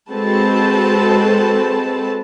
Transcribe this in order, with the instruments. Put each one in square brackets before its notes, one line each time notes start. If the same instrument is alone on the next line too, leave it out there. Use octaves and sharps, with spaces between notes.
[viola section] G#3 C4 F#4 A4 B4 A5